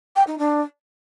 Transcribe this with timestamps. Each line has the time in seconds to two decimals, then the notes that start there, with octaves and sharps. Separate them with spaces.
0.16 G5
0.27 D#4
0.38 D4